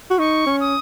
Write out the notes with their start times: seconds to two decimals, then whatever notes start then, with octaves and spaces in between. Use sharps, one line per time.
0.10 F#4
0.19 D#4 C#6
0.46 C#4
0.60 D#6